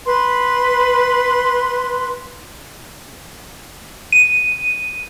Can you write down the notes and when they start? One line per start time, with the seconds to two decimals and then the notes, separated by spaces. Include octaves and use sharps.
0.05 B4 C6
4.12 D#7